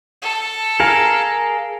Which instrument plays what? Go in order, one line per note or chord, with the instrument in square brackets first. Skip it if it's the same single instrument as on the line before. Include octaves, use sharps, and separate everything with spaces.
[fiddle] A4
[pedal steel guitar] G#4 A#4 F5